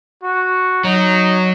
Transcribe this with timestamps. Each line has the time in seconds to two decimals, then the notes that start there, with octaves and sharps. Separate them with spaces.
0.23 F#4
0.84 F#3 D#4